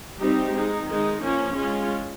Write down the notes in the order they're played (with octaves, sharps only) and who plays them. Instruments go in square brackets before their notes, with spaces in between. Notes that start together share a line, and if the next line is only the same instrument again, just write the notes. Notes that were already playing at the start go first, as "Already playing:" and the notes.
[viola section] G3 C4 D#4 G4
G#3 D#4
D#3 G#3 D#4
F3 A#3 C#4
G#3 C#4 F4